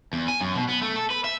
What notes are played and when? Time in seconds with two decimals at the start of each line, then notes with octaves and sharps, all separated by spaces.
0.13 E2
0.28 G#5
0.40 F#2
0.55 B2
0.69 B3
0.81 A3
0.96 A4
1.10 B4
1.24 E5